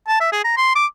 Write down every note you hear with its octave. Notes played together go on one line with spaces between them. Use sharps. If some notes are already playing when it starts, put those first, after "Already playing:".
A5
E5
G#4
A#5
C6
D6